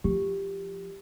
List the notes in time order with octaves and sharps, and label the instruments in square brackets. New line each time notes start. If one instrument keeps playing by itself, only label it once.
[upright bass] F3 [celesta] G4